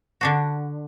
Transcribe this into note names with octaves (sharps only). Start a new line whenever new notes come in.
D3 D4 F#4